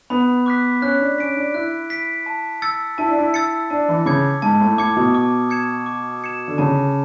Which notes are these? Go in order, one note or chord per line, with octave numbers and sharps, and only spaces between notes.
B3 B5
D6 F#6 B6
C#4 F#6
D4
C#4 B6 D7
D4
E4 F#6
B6 D7
A5
E6 A6 C#7
E4 A5
D4
E4
E6 A6 C#7
D4 A5
E3
C#3 D6 G#6 C#7
G#2 A5
A2
A2 D6 G#6 C#7
B2
D6
G#6 C#7 E7
D6
G#6 C#7 E7
D3
C#3 A5